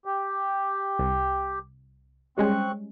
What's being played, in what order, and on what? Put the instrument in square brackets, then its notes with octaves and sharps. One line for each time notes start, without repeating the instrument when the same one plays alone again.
[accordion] G4
[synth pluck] C2
[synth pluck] G3 G#3 C#4 [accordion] C4 C#6 F#6